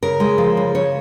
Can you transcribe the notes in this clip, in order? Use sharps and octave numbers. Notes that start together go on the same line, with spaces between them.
C#3 A#4
G#3
F3
C#3
C#3 C#5